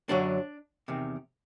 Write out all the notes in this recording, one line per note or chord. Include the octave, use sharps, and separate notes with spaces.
F#2 D3 F#3 D4
E2 C3 D#3